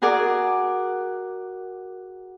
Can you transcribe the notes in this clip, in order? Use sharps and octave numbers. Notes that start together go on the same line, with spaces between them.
F#4 G#4 A#4 D5 F#5